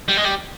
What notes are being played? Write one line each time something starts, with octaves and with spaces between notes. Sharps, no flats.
G3
G#3
G3